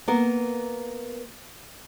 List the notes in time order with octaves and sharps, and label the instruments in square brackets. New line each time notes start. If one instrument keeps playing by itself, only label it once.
[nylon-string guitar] A#3 B3 A#4